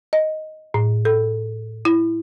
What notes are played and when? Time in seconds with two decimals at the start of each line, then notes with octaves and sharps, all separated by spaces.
0.13 D#5
0.74 A2
1.05 A4
1.85 E4